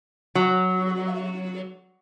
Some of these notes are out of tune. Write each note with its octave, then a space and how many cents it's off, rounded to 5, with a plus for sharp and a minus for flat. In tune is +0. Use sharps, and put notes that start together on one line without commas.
F#3 +0